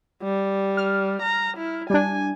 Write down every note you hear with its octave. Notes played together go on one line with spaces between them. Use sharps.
G3
F6
A#5
E4
G3 D4 G#5